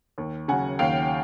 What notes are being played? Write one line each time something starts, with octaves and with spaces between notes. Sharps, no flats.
D#2
C#3 F#3 F#5 G#5
D#2 F5 G5